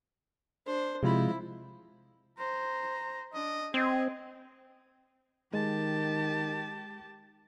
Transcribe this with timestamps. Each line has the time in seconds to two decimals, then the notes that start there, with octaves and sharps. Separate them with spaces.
0.67 D4 C5
1.03 C3 F3 G#3 E4 F4 B5
2.38 C5 A#5
3.33 D4 D#5
3.74 C4 G#4 D#5
5.54 D#3 G#3 G4 A5